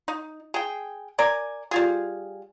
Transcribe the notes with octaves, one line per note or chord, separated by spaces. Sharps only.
D#4
G#4 G5
A#4 D5 G#5
G3 F4 G#4